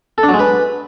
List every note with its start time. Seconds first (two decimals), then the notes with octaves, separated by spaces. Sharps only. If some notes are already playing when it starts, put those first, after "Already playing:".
0.18 A4
0.23 D4
0.29 F#3
0.34 G#3
0.39 B4